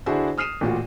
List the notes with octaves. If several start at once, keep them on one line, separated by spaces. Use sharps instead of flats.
D3 D4 E4 F#4 G#4 C5
D#6 F6 C7 D#7 E7
A1 A#2 F4 F#4